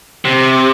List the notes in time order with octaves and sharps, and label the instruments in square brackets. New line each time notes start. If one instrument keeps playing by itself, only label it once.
[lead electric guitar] C3